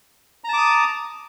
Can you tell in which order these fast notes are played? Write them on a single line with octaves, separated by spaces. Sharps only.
A#5 A5 D6 D#6